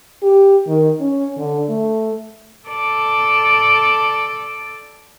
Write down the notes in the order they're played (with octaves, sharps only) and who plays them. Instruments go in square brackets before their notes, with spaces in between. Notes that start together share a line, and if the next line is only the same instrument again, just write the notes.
[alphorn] G4
D#3
C#4
D3
A3
[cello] A4 D5